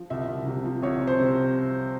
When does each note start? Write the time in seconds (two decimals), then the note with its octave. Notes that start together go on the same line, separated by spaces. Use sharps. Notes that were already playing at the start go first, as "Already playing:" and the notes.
Already playing: F3
0.10 C2 E5
0.28 C2
0.46 C3
0.65 F3
0.82 C2 C#5
1.01 C2
1.07 C5
1.20 C3